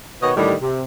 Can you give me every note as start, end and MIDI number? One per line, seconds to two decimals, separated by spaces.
0.22 0.31 47
0.22 0.31 51
0.22 0.31 59
0.22 0.31 73
0.22 0.31 75
0.37 0.54 45
0.37 0.54 50
0.37 0.54 51
0.37 0.54 55
0.62 0.83 48